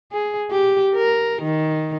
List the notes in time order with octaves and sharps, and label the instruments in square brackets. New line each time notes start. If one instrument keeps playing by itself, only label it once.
[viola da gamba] G#4
G4
A#4
D#3